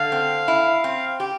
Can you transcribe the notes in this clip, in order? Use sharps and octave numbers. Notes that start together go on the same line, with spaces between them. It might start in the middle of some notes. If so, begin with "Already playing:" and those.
Already playing: D3 F5
C4
E4
C4
G4